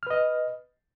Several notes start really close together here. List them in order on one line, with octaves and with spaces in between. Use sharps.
F6 B4 D#5